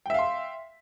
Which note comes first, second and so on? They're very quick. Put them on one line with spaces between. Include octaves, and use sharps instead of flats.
G5 E5 F5 C6